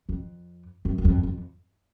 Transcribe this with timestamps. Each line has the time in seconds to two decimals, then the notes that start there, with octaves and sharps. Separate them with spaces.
0.09 F2
0.85 F#2
0.98 F#2
1.05 F2
1.23 F2